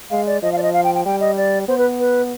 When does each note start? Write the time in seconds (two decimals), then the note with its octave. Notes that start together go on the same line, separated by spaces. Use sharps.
0.10 G#3 F5
0.27 D5
0.42 F3 D#5
0.53 F5
0.58 D5
0.63 D#5
0.73 F5
0.84 G5
0.95 G5
1.05 G3 G5
1.21 D#5
1.37 D5
1.68 B3 C5
1.78 B4
2.00 B4